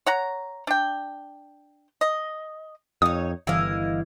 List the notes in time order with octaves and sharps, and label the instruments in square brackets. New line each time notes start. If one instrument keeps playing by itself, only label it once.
[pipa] C#5 F#5 A#5
D4 G5
D#5
[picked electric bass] F2 [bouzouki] D#4 C#5 [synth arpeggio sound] D#6
[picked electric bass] G1 [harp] E3 [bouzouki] E4 D#5 F5